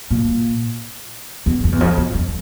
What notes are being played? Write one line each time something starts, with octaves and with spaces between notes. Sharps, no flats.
A#2
E2
F2
E2
F2
E2
F2